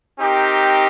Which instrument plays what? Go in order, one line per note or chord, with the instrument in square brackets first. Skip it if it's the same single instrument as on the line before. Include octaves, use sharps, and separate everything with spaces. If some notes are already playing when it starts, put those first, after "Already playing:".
[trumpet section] C4 D#4 G4 A#4